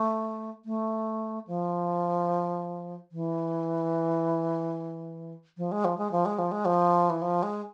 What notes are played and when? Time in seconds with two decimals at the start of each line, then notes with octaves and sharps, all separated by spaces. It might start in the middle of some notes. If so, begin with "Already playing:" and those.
Already playing: A3
0.65 A3
1.47 F3
3.12 E3
5.57 F3
5.72 G#3
5.85 F3
5.98 G#3
6.12 F3
6.25 G#3
6.38 F3
6.52 G#3
6.65 F3
7.10 E3
7.22 F3
7.43 G#3